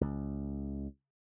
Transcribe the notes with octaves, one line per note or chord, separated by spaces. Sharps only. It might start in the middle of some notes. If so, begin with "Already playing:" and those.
C#2